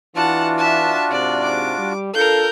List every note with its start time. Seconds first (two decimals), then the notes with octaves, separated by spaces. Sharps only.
0.16 E3 D4 F4 F#4 F#5 A5
0.58 E5 A5
1.11 G#2 C3 D5
1.44 D6
1.78 G3
2.14 D4 F4 A4 A#4 F5 G6